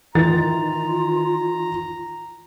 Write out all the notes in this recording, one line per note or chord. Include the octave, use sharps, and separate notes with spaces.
D#3 E3 F4 A#5 A6